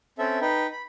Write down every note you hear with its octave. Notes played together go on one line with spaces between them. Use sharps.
C4 C#4 A4 E5
D#4 B4 G5
B5